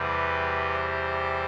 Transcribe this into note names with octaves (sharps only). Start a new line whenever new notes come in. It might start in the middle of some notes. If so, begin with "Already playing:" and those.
Already playing: E2 C3 G3 B4
C5